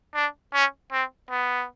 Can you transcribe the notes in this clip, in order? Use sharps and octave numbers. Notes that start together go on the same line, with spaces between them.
D4
C#4
C4
B3